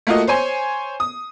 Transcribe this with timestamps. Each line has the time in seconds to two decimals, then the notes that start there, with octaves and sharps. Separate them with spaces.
0.07 A3 A#3 F4 F#4 D#5
0.27 C5 C#5 G#5 C6
1.00 D#6